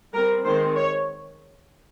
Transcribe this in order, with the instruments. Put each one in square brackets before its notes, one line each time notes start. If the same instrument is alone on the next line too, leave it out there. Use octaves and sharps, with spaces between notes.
[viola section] G3 C4 A#4
D#3 G#3 C4 C5
C#5